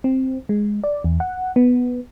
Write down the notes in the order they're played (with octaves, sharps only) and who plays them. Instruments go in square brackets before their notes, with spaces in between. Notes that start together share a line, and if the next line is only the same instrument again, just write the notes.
[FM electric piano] C4
G#3
D5
E2
F#5
B3